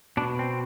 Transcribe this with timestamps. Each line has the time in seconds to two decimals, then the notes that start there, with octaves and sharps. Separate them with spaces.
0.17 B2 D4
0.39 C4